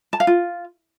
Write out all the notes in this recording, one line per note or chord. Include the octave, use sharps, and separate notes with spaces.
A5
F5
F4